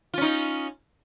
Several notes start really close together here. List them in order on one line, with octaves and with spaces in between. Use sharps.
F4 C#4 D#4